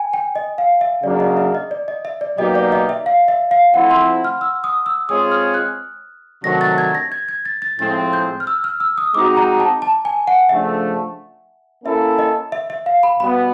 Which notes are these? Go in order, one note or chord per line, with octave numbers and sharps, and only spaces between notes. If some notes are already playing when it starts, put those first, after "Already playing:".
Already playing: G5 G#5
G5
D#5
F5
E5
C#3 F#3 A#3 D4 D5
D#5
E5
D#5
D5
D#5
E5
D5
B2 F#3 A#3 D#4 G4 D#5
D5
D#5
E5
F5
E5
F5
F3 A3 C4 E4 F#5
C6
F6
E6
D#6
E6
G#3 C4 F4 G#4 C#5 D#6
F6
F#6
C3 D#3 F#3 A3 D4 A#6
A6
G#6
A#6
G#6
G#6
A6
A6
A2 F3 G#3 C4 A6
G6
F6
E6
F6
E6
D#6
G#3 C4 D#4 F#4 D6
A#5
A5
A5
G#5
F#5
C#3 F3 A3 D4 E5
A#3 C#4 E4 A4 E5
D#5
E5
E5
F5
B5
B2 G3 B3 B5